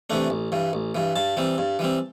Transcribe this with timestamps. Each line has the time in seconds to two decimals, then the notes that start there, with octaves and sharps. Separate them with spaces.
0.10 C3 E3 A3 D4
0.30 A1
0.52 G2 E3
0.73 A1
0.95 G2 E3
1.16 G2 A5
1.37 E3 G3 C4
1.58 G2
1.79 E3 G3 C4